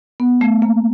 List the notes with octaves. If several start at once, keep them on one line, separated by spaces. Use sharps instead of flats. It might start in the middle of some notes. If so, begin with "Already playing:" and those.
B3
A3
A#3